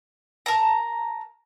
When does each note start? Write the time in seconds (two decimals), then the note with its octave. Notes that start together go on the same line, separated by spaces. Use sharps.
0.46 A#4 A5 A#5